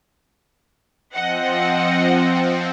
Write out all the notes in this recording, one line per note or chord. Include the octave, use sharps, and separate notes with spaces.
F3 C4 D#5 F#5